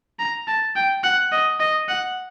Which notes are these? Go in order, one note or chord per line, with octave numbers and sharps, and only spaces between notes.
A#5
A5
G5
F#5
D#5
D#5
F#5